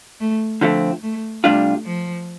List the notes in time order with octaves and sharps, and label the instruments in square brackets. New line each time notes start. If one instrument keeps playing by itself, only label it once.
[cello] A3
[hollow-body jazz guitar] D3 F3 A3 C4
[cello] A3
[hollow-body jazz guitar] C3 G3 D4 F4 [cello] A3
[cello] F3